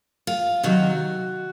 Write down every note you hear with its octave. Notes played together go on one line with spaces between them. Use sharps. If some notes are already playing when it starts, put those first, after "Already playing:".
F4
C3 D#3 F#3 F#4